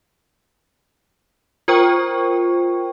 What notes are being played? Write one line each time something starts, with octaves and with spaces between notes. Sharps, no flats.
F4 A#4 C5 G5 C#6